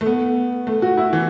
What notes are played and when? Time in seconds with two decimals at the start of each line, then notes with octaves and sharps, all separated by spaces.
0.01 A3
0.06 B3
0.67 A3
0.82 F#4
0.97 E4
1.13 E3